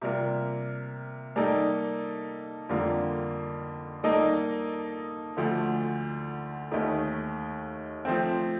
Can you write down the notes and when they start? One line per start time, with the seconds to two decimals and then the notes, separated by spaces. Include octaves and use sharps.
0.01 C3 G3 A#3 F4 A#4
1.36 G3 A#3 D#4 A4
2.69 F2 D3 G3 A#3 F4
4.03 G3 A#3 D#4 A4 D#5
5.37 D2 D3 F3 A3
6.71 D#2 D#3 A3 D#4
8.05 F3 A3 C4